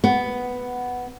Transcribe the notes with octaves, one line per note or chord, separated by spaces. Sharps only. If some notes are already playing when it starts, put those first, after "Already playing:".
B3